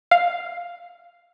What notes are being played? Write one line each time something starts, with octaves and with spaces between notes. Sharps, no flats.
F5